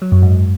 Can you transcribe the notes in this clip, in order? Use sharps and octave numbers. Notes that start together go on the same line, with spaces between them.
F#3
F#2
G#2